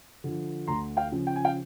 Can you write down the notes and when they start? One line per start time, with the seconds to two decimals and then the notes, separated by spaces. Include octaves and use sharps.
0.24 D3 F3
0.67 D2 A#5 C6
0.97 F5 G5
1.12 C#3 F3
1.27 G5
1.36 G#5
1.45 F5 G5